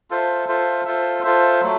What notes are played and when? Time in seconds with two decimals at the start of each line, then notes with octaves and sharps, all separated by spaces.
0.10 F4 A4 C5 E5
0.48 F4 A4 C5 E5
0.85 F4 A4 C5 E5
1.23 F4 A4 C5 E5
1.61 F#3 A3